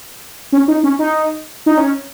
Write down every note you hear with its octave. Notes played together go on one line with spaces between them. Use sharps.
C#4
D#4
C#4
D#4
D#4
C#4